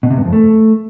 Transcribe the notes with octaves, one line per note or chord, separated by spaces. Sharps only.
B2
C3
G2
F2
A3